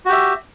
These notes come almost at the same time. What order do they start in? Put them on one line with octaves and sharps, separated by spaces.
F#4 G4 E5